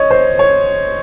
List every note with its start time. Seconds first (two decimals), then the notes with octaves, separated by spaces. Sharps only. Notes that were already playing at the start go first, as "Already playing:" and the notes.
Already playing: C#5 D#5
0.11 C5
0.39 C#5